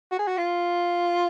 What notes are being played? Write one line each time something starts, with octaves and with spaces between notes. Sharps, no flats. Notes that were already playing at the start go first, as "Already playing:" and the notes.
F#4
G#4
F#4
F4